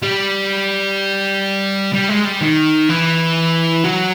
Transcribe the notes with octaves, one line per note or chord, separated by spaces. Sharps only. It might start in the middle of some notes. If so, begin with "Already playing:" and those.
G3
G3
G#3
G3
D#3
E3
F#3